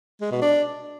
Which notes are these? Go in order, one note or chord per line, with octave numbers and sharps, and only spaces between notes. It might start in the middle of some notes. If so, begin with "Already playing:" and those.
G#3
B2
D4